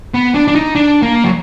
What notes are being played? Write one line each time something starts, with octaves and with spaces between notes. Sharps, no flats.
B3
D4
D4
D#4
D4
A#3
F#3